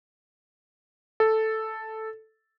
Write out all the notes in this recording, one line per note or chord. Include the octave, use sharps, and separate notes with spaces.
A4